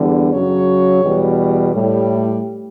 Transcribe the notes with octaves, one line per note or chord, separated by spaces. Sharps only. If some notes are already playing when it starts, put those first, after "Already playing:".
Already playing: E2 D3 G3
F#2 C#3 F#3 C#5
E2 B2 G3
A2 G3